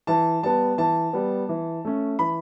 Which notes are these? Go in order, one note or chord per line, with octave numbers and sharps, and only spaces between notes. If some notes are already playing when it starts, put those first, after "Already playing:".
E3 A5
G3 B3 A5
E3 A5
G3 B3
E3
A3 C#4
E3 B5